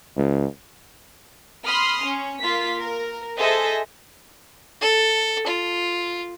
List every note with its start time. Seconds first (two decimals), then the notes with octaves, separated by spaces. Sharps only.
0.17 C#2
1.65 B5 C6 D#6 F6
2.03 C#4
2.42 A#3 F4 B6
2.80 A#4
3.37 G#4 A4 C5 D#5 E5
4.81 A4
5.47 F4